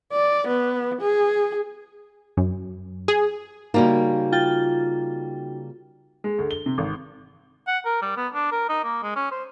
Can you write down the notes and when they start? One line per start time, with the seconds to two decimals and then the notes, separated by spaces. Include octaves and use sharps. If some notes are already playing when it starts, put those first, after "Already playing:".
0.12 D5
0.48 B3
1.01 G#4
2.37 F#2
3.08 G#4
3.74 C#3 G3 A#3 D#4 F#4
4.32 F4 G5 A6
6.24 G#3
6.38 D2
6.51 G7
6.66 C3
6.78 G#1
7.68 F#5
7.85 A#4
8.02 G3
8.17 B3
8.34 D4
8.52 A#4
8.69 D#4
8.84 A#3
9.03 G#3
9.16 C#4
9.32 C5